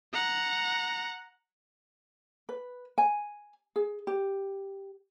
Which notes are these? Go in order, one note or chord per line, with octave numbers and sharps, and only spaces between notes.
F#5 A#5
B4
G#5
G#4
G4